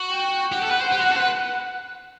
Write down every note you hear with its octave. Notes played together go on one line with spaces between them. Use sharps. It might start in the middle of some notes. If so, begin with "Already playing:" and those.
Already playing: F#4
G5
G4 F#5
A4
B4
C5
G4
F#4
A4
C5
B4